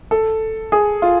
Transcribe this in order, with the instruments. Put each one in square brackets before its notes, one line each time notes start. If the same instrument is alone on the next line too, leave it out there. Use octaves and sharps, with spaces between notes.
[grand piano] A4
G#4
F4